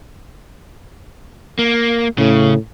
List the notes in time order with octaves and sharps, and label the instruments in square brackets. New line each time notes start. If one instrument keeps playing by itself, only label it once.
[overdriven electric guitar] A#3
[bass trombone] A2 [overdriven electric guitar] C#3